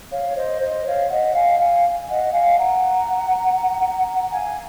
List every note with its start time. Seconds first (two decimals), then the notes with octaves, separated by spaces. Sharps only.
0.11 C#5 F5
0.25 C#5
0.36 C5 D#5
0.61 C5 D#5
0.85 C#5 F5
1.10 D#5 F#5
1.35 F5 G#5
1.59 F5 G#5
2.08 D#5 F#5
2.33 F5 G#5
2.58 F#5 A#5
4.30 F5 G#5